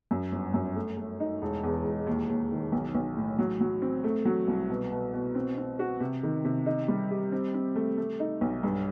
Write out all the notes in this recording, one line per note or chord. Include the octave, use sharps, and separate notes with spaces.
F#2
G1
F#2
A3
A3
D#4
E1
E2
E1
D#2
D#2
D#3
B1
B1
A2
F#3
F#3
C4
A3
F#3
C2
B2
B2
B2
C4
C4
F#4
C3
D#3
C3
D#4
G3
G4
C4
C4
A3
A3
D#4
B1
G2